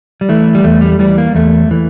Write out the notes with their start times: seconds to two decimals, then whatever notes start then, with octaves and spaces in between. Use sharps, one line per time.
0.21 G3
0.29 E3 A3
0.55 G3
0.64 E2 A3
0.81 G3
0.99 E3 G3
1.18 A#3
1.34 E2 A3
1.71 E3